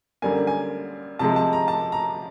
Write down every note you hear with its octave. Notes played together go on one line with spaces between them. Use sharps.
F#2 D3 G3 A#3 G#5
G#5
C3 F3 G#3 A5
A5
A#5
A5
A#5